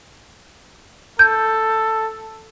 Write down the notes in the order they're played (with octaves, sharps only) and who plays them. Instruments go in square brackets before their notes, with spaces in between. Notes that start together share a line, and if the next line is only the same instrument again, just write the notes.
[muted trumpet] A4 [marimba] G6